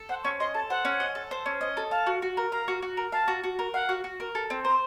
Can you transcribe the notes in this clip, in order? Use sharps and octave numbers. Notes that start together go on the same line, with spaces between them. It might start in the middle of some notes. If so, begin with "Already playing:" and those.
Already playing: A4
C5 F#5
C#4 C#6
D#5 C6
A4 A5
C5 F#5
C#4
D#5
A4
C5
C#4
D#5
A4
F5 A5
F#4
F#4
A#4
F5 A#5
F#4
F#4
A#4
F5 A5
F#4
F#4
A#4
F5 F#5
F#4
F#4
A#4
A4
C4
C5 A#5